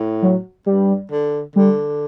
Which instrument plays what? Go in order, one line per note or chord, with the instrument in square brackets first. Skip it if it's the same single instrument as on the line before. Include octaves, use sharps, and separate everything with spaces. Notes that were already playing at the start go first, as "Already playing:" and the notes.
Already playing: [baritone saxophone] A2
[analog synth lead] F#3
[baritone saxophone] G2 [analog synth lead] G3
[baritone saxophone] D3
[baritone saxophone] D3 [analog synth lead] G3